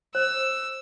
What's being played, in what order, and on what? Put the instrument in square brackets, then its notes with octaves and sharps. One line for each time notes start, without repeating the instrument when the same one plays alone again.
[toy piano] C5 [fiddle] E6